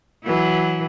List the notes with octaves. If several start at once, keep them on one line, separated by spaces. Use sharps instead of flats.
E3 F#3 E4